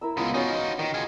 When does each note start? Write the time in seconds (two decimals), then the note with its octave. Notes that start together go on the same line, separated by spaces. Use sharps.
0.01 E4 A#4 E6
0.17 C#3 G#3 B3 F4
0.34 C#4 D#4 F4 F#4 D#5
0.54 C5
0.79 D#3 F#4 D#5
0.94 F4 G#4